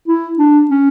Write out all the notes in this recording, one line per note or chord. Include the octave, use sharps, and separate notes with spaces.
E4
D4
C#4